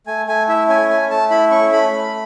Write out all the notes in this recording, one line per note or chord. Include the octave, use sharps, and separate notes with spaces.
A3 G#5
A3 G#5
E4 E5
C#4 G#5
A3 G#5
A3 A5
E4 B5
C#4 C#6
A3 B5
A3